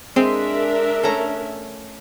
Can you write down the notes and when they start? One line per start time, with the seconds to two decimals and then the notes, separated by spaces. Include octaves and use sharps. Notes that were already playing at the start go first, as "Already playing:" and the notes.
0.16 G#3 C4 D4 A#4 E5
1.03 A3 C#4 A#5